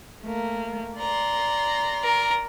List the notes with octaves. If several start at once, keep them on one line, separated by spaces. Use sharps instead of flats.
A3 A#3
D5 A#5 C6
A#4